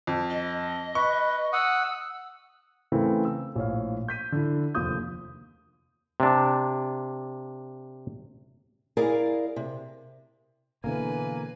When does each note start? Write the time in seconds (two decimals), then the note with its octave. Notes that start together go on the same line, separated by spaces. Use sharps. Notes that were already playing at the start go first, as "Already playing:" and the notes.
0.07 F2
0.30 D#5
0.95 B4 C#6
1.53 F#5 D#6 E6
2.92 C#3 E3 A3 C4 E4 A#4
3.25 E6
3.55 A#1 A2 C#5 F5
4.08 G6 B6 D#7
4.32 D3 E4
4.75 F1 D#2 F3 D#6 G6
6.20 C3 D4
8.97 E4 G#4 A#4 D5 F5
9.56 C3
10.84 B2 D3 E3 A#3 B4 G#5